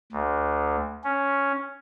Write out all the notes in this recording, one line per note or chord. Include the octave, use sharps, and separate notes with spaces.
D2
C#4